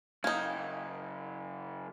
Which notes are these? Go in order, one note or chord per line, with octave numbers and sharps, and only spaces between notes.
F#2 C#3 A#3 D#4 D#6 G6 G#6